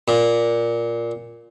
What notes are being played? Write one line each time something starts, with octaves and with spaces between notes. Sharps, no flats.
A#2